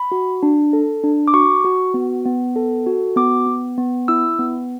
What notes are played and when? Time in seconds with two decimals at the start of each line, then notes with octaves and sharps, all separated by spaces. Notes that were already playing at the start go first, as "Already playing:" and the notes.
Already playing: B5
0.12 F#4
0.43 D4
0.73 A4
1.04 D4
1.28 D6
1.33 F#4 C#6
1.65 F#4
1.94 B3
2.25 B3
2.56 A4
2.86 F#4
3.16 B3 D6
3.46 B3
3.78 B3
4.08 E4 E6
4.39 B3